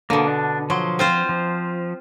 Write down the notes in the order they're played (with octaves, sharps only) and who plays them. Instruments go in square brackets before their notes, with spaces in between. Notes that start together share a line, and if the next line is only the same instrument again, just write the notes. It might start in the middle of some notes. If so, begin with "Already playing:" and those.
[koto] B2 D3 [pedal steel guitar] A#3
[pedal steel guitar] D4
[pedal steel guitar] F3 C6 [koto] F#3
[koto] C4 F4 C5
[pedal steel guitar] F3